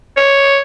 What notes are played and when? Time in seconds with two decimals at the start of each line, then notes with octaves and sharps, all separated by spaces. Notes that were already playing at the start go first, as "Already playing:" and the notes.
0.17 C#5